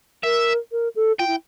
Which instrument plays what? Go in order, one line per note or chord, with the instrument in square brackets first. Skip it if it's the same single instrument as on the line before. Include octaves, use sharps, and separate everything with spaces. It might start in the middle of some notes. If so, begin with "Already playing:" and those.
[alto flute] A#4 [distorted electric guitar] E5
[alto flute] A#4
A4
[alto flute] F4 [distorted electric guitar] G5
[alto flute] E4